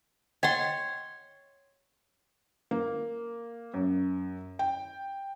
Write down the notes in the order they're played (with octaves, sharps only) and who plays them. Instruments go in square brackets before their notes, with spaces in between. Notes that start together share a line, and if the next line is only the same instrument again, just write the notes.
[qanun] C#5 C6 [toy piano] D#5 F#5 G5
[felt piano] A#3
F#2
G5